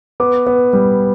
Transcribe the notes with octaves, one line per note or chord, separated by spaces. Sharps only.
B3 D6
B3
G3